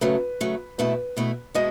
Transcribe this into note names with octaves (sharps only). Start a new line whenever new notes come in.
C#3 F#3 A3 B4
C#3 F#3 A3
B2 A3 E4 B4
B2 A3 E4
B2 G#3 B3 E4 D#5